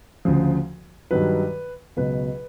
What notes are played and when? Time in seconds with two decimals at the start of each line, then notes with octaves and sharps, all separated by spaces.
0.25 D2 C#3 F3
1.11 G2 D#3 F#3 B4
1.96 C#2 B2 F#3 B4